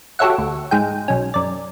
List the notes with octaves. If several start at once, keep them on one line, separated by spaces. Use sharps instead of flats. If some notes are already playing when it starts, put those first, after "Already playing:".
F#4 G4 A4 C#5 E5 F#5
D2
G#2 G#4 G5
B1 C#4
F#2 D5